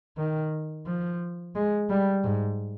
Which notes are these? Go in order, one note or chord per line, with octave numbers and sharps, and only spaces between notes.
D#3
F3
G#3
G3
G#2